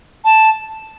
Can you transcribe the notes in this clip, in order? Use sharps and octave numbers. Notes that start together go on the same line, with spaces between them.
A5